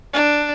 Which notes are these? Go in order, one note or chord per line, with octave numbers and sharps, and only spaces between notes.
D4